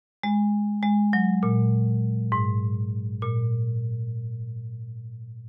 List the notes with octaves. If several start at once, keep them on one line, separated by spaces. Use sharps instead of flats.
G#3
G#3
F#3
A#2
G#2
A#2